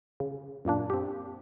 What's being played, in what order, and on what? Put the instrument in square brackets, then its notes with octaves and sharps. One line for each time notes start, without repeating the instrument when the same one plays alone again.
[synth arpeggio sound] C#3
F#2 A#2 A#3 D4
C4 G4